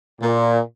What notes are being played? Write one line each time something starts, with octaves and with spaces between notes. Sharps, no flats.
A#2